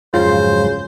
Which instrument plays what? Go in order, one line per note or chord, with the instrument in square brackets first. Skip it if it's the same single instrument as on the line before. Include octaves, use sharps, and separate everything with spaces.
[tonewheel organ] F2 G#2 F#3 [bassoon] C#3 [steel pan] F4 [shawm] C5